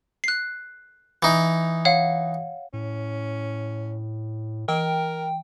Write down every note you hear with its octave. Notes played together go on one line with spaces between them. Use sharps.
F#6 C7
E3 D#4
C#5 F5 F#5
A2 C#4
E3 A#4 G5